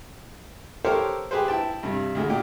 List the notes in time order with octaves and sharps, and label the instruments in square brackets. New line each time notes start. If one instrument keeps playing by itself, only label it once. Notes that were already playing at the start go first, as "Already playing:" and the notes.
[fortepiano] G4 A4 A#4 C5 C#5
G4 G#4 B4 C5
E4 G5 A5
G2 C3
D2 G#3
A#2 G4